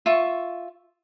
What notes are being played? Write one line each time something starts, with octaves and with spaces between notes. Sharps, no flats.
F4 E5 C#6